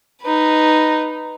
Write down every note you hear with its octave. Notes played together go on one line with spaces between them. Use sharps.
D#4 B4